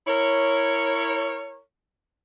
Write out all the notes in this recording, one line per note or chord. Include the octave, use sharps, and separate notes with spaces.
E4 A#4 C#5